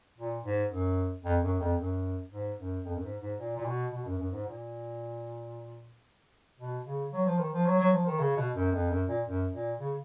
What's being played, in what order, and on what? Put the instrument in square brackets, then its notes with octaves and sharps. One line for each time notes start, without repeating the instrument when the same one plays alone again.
[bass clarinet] A#2
G#2
F#2
F2
F#2
F2
F#2
G#2
F#2
F2
F#2
G#2
G#2
A#2
A#2
B2
B2
F#2
F#2
G#2
A#2
B2
C#3
F#3
F3
D#3
F3
F#3
F#3
F3
D#3
C#3
B2
F#2
F2
F#2
A#2
F#2
A#2
C#3